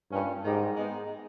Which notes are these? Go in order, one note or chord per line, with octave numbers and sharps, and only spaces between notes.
G2 A#2 G3 C#4
G#2 D#3 G#3 D#4 G4
G#3 B3 D#4